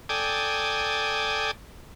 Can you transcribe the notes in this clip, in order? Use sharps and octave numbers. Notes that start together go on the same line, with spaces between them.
A4 D5 G5 G#5 D#6